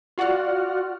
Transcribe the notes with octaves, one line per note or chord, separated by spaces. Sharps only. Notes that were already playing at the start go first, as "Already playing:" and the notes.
F4 F#4 D5 F#5 F6